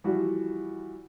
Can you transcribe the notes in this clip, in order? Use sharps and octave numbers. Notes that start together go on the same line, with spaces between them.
E3 F3 G3 E4 F#4